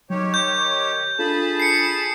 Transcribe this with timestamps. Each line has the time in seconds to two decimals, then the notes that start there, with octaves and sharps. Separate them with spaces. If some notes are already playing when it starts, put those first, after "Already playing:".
0.10 D#3 F#3 G4 C#5
0.34 C#6 G6
1.19 D4 F4 G#4 A4 A5 B5
1.60 C7 C#7